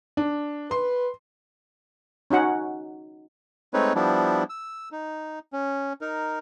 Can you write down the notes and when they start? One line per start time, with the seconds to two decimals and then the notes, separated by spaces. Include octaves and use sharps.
0.17 D4
0.71 B4 C6
2.30 C#4 D#4 F#4 F#5
3.74 G#3 A3 C4 D#4 B4 C#5
3.95 F3 G3 B3 D4 E4
4.50 E6
4.92 D#4
5.53 C#4
6.01 D#4 A#4